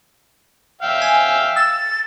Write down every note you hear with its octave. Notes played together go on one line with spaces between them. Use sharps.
E5 F5 G5
G#5
E6 A6